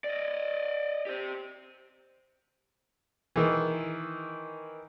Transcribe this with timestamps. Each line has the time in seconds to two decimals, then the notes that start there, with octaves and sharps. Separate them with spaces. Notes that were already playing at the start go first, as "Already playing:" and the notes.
0.04 D5 D#5
1.07 G4 C5
3.36 D#3 E3